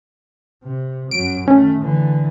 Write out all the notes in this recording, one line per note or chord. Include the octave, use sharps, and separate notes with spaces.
C3
F#2 F#3 D7
D#3 A3 C#4
D3 E3